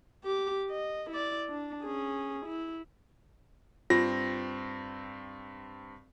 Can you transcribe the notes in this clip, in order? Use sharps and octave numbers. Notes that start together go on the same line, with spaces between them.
G4 D6
D#5
E4 D5
D4
C#4 G#4
E4
G2 C4 F4 A#6